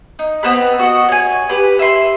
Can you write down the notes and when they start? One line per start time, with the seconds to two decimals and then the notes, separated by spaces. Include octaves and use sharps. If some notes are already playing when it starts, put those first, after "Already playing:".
0.19 D#4
0.43 B3 C4 B4 B5
0.79 F#4 D#5
1.09 C#5 G#5
1.49 G4 B4
1.79 E5 B5 C6